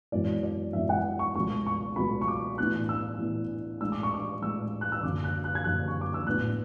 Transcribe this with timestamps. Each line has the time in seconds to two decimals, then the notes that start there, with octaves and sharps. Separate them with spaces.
0.12 G#1 F#2 E3 B3 D5
0.43 D5
0.73 G#1 F#2 E3 B3 E5
0.89 F#5
1.19 C#6
1.35 C#2 B2 F#3 A3 C#6
1.66 C#6
1.96 C#2 B2 F#3 A3 B5
2.21 C#6
2.28 D6
2.58 A2 E3 B3 D4 F#6
2.89 E6
3.19 A2 E3 B3 D4
3.81 A2 G#3 D4 E6
3.92 D6
4.03 C#6
4.14 D6
4.42 A2 G#3 D4 E6
4.81 F#6
4.92 E6
5.03 F#1 F#2 D3 D6
5.24 F#6
5.44 F#6
5.55 G#6
5.64 F#1 F#2 D3 F#6
5.88 C#6
6.01 D6
6.14 E6
6.26 A1 A2 F#3 B3 D4 F#6